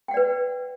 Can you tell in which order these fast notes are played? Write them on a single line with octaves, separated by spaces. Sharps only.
G5 F#5 D5 B4